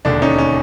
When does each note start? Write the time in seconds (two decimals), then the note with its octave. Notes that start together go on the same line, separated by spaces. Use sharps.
0.05 E1 D#2 D3 D4
0.22 C#4 D#4
0.38 C#4